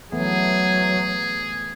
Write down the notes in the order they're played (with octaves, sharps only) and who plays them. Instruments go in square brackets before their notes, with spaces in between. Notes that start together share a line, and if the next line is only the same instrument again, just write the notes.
[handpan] E3 A3 B3 [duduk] F#3 [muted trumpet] G#4